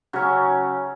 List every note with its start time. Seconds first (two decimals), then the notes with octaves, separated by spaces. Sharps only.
0.13 C#3 F#3 C#4